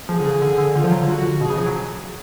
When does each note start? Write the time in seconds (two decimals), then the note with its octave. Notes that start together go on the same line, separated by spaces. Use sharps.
0.09 F3 G#4
0.20 D3
0.26 C#3
0.42 D3
0.58 D3
0.75 D3 F4
0.84 F3
0.92 F#3
1.00 D3
1.08 F#4
1.41 B2 G#4
1.50 C#3
1.58 F3
1.66 F#3